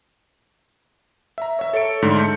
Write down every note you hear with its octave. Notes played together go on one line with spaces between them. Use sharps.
E5 A#5
C#5 E5
A4 C#5 C#7 D7
G#2 D3 A3
G6 C#7